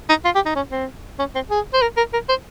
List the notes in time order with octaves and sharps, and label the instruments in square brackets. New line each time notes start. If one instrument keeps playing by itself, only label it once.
[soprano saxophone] D#4
F4
G4
D#4
C#4
C4
C#4
C4
G#4
C5
A#4
A#4
A#4
C5